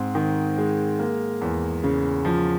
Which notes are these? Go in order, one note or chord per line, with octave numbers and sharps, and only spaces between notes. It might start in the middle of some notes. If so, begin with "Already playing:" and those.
Already playing: G#2 C4
D#3
G#3
A#3
E2
C#3
F3